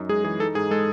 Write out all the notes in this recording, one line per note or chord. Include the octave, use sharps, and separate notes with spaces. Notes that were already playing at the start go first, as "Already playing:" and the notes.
Already playing: F#2 D#4
G#3 G#4
E3 G#4
D#4 A4
G#2 G#4
G#3 A4